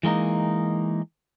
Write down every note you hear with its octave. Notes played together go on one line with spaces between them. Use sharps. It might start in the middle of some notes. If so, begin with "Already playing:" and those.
E3 G#3 A#3 D#4